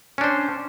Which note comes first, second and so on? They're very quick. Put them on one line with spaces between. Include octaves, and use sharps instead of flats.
C#4 D4 C5